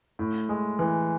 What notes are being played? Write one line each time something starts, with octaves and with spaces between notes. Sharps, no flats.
A2
G#3
E3